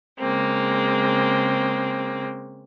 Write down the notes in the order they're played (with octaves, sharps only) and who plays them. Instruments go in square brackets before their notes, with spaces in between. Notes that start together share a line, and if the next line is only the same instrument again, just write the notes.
[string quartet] C#3 G#3 A#3 C4